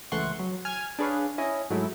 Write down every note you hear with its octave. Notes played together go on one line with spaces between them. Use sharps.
C#2 E3 A3 F#5 C6 C#6
F#3
G#5 F6 G#6
D4 G#4 B4 C#5 F5
C#4 E4 D#5
G#2 F#3 G#3 A3 E4